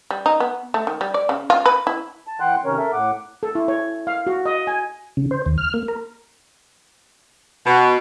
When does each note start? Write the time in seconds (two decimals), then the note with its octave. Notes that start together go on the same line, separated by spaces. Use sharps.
0.11 G3
0.26 D#4
0.40 B3
0.74 A3
0.87 D#3
1.01 G3
1.14 D5
1.29 C#3
1.50 F4
1.66 B4
1.87 E4
2.27 A5
2.40 E3 F#5 G5 C6 F#6
2.65 C3 D#3 C#4 A#4 C#5
2.78 A4 A#4 E5
2.93 A2 F#5 D6
3.43 A4
3.55 E4
3.68 C#5
4.07 F5
4.27 F#4
4.46 D#5
4.67 G#5
5.17 C#3
5.31 C5
5.46 D#2
5.58 F6
5.74 A#3
5.88 A#4
7.66 B2